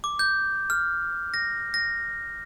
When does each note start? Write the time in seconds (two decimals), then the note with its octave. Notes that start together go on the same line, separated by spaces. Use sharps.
0.04 D6
0.19 G6
0.70 F6
1.34 A#6
1.74 A#6